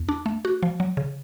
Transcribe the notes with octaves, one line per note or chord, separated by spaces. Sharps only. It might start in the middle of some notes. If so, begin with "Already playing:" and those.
Already playing: E2
D4
A3
F#4
F3
F#3
C#3